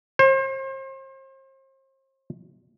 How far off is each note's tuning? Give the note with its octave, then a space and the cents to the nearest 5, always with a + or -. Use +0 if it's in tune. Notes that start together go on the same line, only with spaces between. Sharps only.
C5 +40